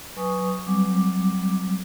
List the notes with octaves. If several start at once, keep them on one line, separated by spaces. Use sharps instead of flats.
F#3 B4 G#5 C#6 D#6
F#3 G3 C4 D6